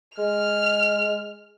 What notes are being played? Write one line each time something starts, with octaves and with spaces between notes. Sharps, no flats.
G#3 F6